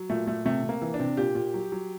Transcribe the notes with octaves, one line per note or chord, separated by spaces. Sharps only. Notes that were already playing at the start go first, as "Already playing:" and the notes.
Already playing: F#3
A#2 A3
A#2 A3
C3 A3
C3
A#3
E3
D4
C3
A#2 G4
A#2
F#3
F#3